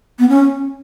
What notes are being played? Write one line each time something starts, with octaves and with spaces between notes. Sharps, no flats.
B3
C#4